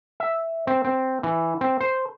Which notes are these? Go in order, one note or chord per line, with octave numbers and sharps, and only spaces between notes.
E5
C4
C4
E3
C4
C5